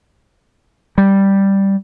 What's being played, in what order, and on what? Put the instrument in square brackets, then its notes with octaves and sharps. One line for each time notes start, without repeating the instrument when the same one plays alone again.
[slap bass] G3